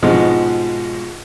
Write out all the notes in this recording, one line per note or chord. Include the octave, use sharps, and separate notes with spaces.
G#2 B2 F3 G#3